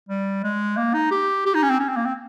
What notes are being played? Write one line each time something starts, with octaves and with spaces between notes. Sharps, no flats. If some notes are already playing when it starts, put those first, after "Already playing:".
G3
G#3
A#3
D#4
G4
G4
D#4
C#4
C4
C#4
C4
A#3
C4